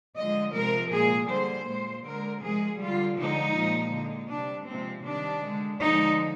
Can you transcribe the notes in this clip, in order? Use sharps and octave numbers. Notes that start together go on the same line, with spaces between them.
D3 F3 G#3 D#5
C3 F3 G#3 A#4
A#2 G#3 G#4
D3 G3 C5
A#2 G#3 C5
D3 G#3 A#4
C3 F3 G#3 G#4
D3 G3 F4
D3 F3 G#3 D#4
A#2 F3 G#3
D3 G#3
C3 G3 D4
C3 F3 G#3 C4
C3 D#3 G3 D4
D3 G#3
D3 F3 G#3 D#4